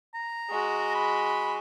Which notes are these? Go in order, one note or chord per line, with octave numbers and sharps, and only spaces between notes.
A#5
G#3 F#4
B5